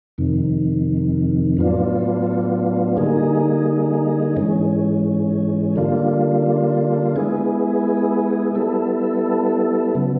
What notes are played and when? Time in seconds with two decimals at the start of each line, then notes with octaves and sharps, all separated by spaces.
0.18 F2 C3 D#3
1.57 A2 F#3 B3 D4 F4
2.97 D3 G3 A#3 D#4 G#4
4.37 G#2 E3 G#3 C#4
5.76 D3 G3 A#3 D4 F4
7.16 G#3 B3 E4 G#4
8.55 G3 B3 E4 A4
9.95 C#3 F#3 B3